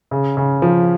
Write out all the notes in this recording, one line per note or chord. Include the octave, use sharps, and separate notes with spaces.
C#3
C#3
F3